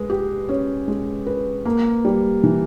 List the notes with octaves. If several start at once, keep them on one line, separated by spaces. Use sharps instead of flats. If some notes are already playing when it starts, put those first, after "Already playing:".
Already playing: G#3 B4
G4
C#4
G#3
B4
A#3
G3
E3